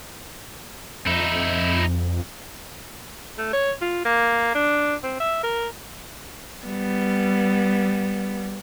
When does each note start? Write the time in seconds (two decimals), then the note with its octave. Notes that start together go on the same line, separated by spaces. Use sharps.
1.07 F2 D#4 E4
3.38 A3
3.53 C#5
3.81 F4
4.05 A#3
4.55 D4
5.03 C4
5.20 E5
5.43 A#4
6.65 G3 B3